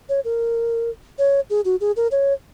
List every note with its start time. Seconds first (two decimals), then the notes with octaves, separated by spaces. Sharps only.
0.09 C#5
0.25 A#4
1.18 C#5
1.50 G#4
1.65 F#4
1.81 G#4
1.96 A#4
2.11 C#5